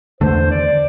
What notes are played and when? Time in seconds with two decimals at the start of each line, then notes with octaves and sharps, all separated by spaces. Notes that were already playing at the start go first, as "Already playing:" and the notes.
0.21 E2 D3 A3 C5
0.51 D5